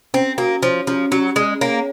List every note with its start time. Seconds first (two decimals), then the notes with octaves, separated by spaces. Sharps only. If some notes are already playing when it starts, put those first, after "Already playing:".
0.14 C4 C#4
0.38 A#3 F#4
0.63 F3 C#5
0.87 F3 C#4
1.11 F#3 C#4
1.36 G#3 G#4
1.61 A#3 C#5